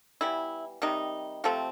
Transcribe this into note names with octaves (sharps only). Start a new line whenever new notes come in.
E3 G3 B3 E4
C3 D#3 G3 D#4
C3 F3 A3 C4